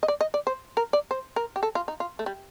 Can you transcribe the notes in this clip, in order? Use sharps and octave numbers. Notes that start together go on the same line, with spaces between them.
D#5
D5
D#5
D5
C5
A#4
D5
C5
A#4
G4
A4
F4
D#4
F4
A3
G3